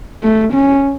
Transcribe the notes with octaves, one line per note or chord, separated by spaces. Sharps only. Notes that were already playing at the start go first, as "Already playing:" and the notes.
A3
C#4